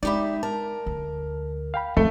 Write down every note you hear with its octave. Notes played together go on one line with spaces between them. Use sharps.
G#3 D#4 G4 D5 E5 B5
A#4 A5
D2
F5 G5 B5
G#1 F2 D3 A3